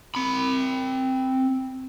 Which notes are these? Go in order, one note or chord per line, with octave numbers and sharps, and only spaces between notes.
C4 B5